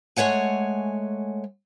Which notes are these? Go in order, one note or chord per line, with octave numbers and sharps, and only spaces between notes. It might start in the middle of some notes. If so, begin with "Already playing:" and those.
G#3 A3 C#5 F#5 G#5